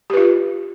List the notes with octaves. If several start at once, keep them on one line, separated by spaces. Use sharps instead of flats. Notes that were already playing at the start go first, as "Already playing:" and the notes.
F4 G4 B4